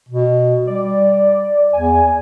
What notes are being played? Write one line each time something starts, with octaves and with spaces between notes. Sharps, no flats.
B2
G3 D5
E2 G#5